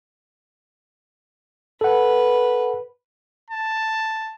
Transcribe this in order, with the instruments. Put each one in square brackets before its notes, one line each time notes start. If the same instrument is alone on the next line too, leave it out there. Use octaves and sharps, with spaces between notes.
[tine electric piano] A4 F#5 [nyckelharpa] B4
[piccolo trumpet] A5